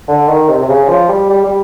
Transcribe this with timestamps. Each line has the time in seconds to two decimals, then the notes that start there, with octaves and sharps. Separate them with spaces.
0.08 D3
0.29 D#3
0.49 C3
0.62 C3
0.69 C#3
0.88 F3
1.09 G3
1.29 G3
1.44 G3